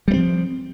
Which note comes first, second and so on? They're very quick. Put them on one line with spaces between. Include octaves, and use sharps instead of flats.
G3 A#3 C4 F3